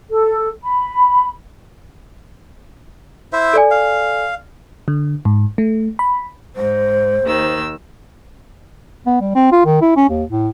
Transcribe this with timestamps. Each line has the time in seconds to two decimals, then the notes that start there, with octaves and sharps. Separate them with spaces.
0.10 A4
0.63 B5
3.33 E4 C5 E5
3.53 A4 D5 G#5
3.71 F5
4.88 D3
5.25 G#2
5.58 A3
5.99 B5
6.56 G#2 C5
7.24 D#2 D#3 E6
9.06 B3
9.21 G3
9.35 C4
9.52 F4
9.66 D#3
9.82 E4
9.97 C#4
10.09 D#2
10.29 A2